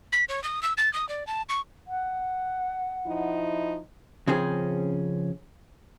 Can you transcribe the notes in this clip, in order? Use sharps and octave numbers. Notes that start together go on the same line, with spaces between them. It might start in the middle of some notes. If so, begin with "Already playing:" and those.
B6
C#5
D#6
E6
A6
D#6
D5
A5
C#6
F#5
F3 D#4 E4
C#3 F3 C4 C#4 G#4